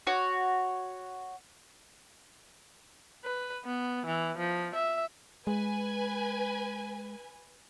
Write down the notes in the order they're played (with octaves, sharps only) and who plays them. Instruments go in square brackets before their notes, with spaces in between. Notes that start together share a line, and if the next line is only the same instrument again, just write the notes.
[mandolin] F#4 C#5
[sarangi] B4
B3
E3
F3
E5
[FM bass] G#3 [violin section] B4 G#5